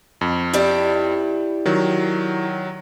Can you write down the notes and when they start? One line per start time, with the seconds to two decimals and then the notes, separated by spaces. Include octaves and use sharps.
0.21 F2
0.53 E4 G4 D5
1.66 D#3 F#3